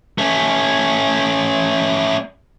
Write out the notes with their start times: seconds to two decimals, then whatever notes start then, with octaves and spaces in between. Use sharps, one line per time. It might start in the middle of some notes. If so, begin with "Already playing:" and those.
0.18 A3 C#4